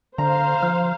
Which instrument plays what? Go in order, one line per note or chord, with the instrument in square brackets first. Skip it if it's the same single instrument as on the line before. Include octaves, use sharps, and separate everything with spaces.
[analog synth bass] D3 [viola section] C5 F5 [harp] A#5
[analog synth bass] F3 [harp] F6